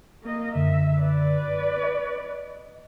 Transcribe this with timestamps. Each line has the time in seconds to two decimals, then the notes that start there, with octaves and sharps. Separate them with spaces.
0.23 A#3 D#5
0.55 F#2 D3 E5
0.99 B4 D5
1.83 D#5